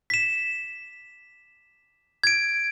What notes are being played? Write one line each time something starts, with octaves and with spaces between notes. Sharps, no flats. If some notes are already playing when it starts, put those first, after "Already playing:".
B6 E7
G#6 D7